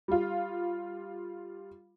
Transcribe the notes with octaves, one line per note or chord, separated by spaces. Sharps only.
G3 F4